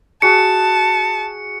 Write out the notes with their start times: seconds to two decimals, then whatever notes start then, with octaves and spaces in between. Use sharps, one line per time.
0.22 F#4 G#4 A5 C#7